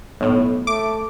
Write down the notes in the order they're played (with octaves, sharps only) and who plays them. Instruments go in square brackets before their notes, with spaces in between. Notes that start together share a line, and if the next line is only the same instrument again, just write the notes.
[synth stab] B1 A2
[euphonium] A3 [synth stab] D6